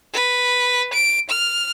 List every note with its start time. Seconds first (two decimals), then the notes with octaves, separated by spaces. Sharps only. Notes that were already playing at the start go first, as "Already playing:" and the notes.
0.13 B4
0.93 D7
1.30 F6